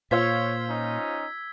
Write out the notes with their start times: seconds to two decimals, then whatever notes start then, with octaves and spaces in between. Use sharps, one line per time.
0.11 A#2 F4 C5 C#5 F5 E6 G#6 B6
0.68 C#4 D#4